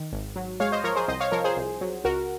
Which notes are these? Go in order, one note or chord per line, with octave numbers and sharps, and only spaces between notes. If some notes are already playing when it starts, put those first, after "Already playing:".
Already playing: D#3
G#1
F#3
G#3 C#5 F5
C5 D#5
F3 A#4 C#5
G#4 C5
C2 C5 D#5
C#5 F5
F3 A#4 C#5
G#4 C5
C2
F#3
C#2 F#4 A#4